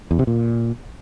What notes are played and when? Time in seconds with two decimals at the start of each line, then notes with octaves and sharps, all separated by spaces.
0.11 E2
0.19 C3
0.27 A#2